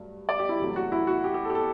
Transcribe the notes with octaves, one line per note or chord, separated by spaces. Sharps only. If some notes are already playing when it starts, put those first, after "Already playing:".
Already playing: G2 F#3 A3
D5
G4
E4
E2 C3 F#3 A3
F#4
E4
F#4
G4
G4
A4
G4
A4